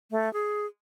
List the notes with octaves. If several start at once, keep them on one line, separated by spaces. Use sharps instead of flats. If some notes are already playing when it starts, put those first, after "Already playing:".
A3
G#4